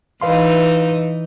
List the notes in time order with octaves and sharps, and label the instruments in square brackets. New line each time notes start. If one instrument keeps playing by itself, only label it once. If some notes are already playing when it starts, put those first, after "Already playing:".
[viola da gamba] E3 D#4 [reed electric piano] B4 F5 C6